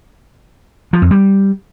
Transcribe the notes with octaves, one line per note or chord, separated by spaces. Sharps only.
F3
F2
G3